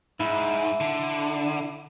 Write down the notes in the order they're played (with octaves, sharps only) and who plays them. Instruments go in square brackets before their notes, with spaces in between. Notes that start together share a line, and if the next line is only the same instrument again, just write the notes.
[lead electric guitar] G#2 [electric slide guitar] E4
[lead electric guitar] D3